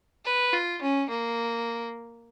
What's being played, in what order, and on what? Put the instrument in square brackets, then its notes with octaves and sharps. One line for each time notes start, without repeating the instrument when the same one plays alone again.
[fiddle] B4
F4
C#4
A#3